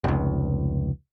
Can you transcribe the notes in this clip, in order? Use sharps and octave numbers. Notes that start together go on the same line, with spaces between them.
F1 C#2